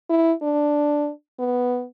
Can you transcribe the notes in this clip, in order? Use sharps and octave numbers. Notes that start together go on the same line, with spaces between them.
E4
D4
B3